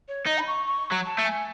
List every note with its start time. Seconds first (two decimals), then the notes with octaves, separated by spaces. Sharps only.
0.08 C#5
0.27 D#4 D#5
0.38 B5
0.47 C#6
0.67 C#6
0.92 F#3
1.06 A5
1.19 A3
1.25 G#5